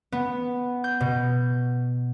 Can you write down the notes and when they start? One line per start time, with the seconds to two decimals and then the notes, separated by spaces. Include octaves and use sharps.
0.12 B3
0.84 G6
1.00 B2